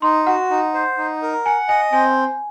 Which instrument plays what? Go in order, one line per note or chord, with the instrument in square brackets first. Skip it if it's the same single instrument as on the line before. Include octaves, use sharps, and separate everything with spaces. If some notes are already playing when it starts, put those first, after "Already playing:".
[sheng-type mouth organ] D#4 [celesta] C6
[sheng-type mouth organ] F#4 [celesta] F#5
[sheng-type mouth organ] D#4
C5
D#4
A#4
[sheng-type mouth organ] F#5 [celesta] G#5
[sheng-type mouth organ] D#5 [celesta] G#5
[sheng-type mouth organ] C4 [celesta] G#5